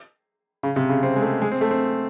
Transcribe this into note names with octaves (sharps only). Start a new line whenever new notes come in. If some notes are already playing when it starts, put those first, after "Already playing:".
C#3
C3
C#3
C4
G#3
A3
G#3
C4
A3
C4